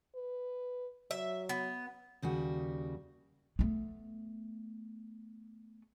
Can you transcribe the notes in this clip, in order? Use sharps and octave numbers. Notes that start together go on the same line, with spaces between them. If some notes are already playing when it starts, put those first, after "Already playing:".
B4
F#3 E5
B3
D#2 C#3 G3 F#4
A3 B3